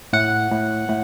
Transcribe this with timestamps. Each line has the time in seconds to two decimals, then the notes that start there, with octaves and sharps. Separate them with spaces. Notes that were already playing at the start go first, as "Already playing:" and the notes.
0.13 A2 F#5
0.51 A2
0.89 A2